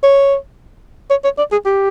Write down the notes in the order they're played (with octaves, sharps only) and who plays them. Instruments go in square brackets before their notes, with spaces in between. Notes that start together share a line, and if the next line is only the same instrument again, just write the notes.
[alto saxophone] C#5
C#5
C#5
D5
G#4
G4